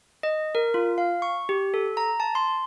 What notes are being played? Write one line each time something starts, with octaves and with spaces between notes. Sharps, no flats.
D#5
A#4
F4
F5
C#6
G4
A4
A#5
A5
C6